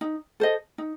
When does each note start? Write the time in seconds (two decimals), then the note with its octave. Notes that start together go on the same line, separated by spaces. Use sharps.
0.01 D#4
0.40 A4 C5 D#5
0.78 D#4